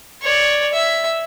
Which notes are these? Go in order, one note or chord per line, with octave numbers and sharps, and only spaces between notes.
C#5 D5
E5